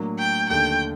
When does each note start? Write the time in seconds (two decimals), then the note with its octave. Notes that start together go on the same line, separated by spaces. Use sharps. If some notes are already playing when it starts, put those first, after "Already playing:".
Already playing: A2 F#3 A#3 D4
0.19 G5
0.50 D#2 D3 A3 G5